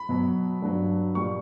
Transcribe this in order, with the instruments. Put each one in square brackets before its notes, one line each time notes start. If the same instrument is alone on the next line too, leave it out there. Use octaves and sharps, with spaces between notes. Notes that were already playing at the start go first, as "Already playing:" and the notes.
Already playing: [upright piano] B5
B2 F#3
G2 F#3
A#2 G3 C#6